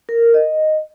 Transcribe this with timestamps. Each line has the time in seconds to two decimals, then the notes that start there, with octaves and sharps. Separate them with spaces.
0.09 A#4
0.34 D#5